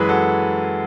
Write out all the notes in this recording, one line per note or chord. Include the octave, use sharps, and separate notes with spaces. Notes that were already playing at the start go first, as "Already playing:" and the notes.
Already playing: F#2 E3 G#3 G#4 B4
F#4 A4